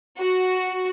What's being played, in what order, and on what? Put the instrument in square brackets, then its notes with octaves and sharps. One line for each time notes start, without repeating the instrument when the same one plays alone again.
[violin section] F#4